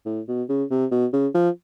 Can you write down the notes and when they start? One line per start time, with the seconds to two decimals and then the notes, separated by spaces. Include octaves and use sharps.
0.06 A2
0.28 B2
0.49 C#3
0.70 C3
0.91 B2
1.13 C#3
1.34 F3